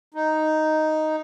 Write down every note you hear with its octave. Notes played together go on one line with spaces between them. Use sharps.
D#4